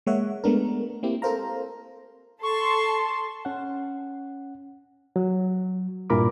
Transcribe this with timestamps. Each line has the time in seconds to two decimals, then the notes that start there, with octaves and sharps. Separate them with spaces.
0.06 G#3 A#3 C#5 E5 F#5
0.44 G#3 A3 B3 D4 A#4
1.03 A#3 C4 E4 G4
1.22 A4 A#4 C5 F5 A#5
2.43 A4 A5 C6 C#6
3.45 C#4 F#5
5.16 F#3
6.10 G2 A#2 E4 A#4 B5 D6